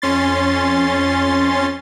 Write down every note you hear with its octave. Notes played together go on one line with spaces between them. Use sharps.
F2 C#4 C6 A6